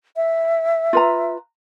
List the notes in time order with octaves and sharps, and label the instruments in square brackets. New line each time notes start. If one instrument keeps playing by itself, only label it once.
[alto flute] E5
[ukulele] F4 B4 A#5